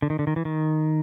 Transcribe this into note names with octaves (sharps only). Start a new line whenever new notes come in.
D3
D#3
D3
D#3
E3
D#3